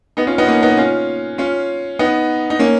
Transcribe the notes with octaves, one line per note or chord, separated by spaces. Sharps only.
B3 D#4
C#4 F4
B3 D#4
A#3 C#4
B3 D#4
C#4 F4
C#4 F4
B3 D#4
D#4
A#3 C#4